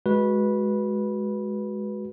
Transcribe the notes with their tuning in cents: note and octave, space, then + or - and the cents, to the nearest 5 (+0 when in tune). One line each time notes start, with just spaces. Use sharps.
G#3 +10 F#4 +0 B4 -15